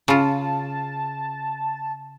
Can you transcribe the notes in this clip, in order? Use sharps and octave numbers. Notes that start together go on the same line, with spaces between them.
C#3 F4 A5